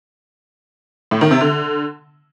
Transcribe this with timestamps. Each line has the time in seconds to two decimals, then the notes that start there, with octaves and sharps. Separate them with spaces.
1.11 A2
1.21 D#3
1.31 C3
1.41 D3